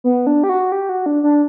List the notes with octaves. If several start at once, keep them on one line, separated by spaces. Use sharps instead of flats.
B3
D4
G4
F#4
G4
F#4
D4
D4